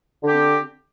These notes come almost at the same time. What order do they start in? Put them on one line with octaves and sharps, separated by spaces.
D3 G4 C4